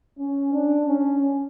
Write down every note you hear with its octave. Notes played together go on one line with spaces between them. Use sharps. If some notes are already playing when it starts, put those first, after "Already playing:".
C#4
D4
C#4